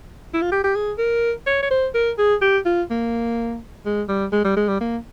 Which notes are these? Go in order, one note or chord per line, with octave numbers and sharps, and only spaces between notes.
E4
F4
G4
G4
G#4
A#4
C#5
C#5
C5
A#4
G#4
G4
F4
A#3
G#3
G3
G#3
G3
G#3
G3
A#3